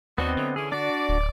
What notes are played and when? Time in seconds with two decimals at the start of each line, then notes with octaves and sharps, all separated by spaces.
0.18 D#2 G3 B3 C4 D4 F#4 D#5
0.37 D3 F#3 A3
0.56 E3 C#4 G#4
0.72 D4 F#4 D5
1.09 D1